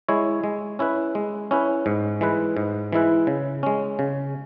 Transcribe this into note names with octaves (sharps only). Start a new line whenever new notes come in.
G#3 E4 C#5
G#3
C#4 E4 B4
G#3
C#4 E4 B4
G#2
E3 G#3 E4 B4
G#2
E3 G#3 E4 B4
C#3
G#3 C#4
C#3